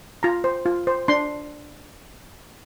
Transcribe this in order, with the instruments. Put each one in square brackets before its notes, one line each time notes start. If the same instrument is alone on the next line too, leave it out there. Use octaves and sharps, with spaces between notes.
[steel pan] F4 A#5
C5
F4
C5
D4 C6